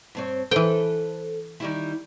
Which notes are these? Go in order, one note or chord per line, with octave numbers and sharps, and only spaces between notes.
G2 C4 C#5
E3 A4 B4 C5 G5
D#3 G3 E4